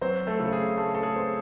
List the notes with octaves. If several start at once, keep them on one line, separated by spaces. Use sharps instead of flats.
F#3 C4 C5
A3 A4
C#3
G#4
A3
A4
G#4
C4 C5